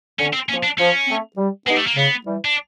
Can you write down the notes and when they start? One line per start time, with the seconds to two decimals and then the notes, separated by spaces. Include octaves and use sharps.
0.19 D3 C#4
0.33 C4
0.49 F3 A#3 C#4
0.63 D4
0.78 F3 C#4
1.07 A3 C4
1.37 G3
1.66 G#3 B3 D#4 G4
1.76 A3
1.87 A#3
1.96 C#3 B3
2.25 E3 G3
2.45 D4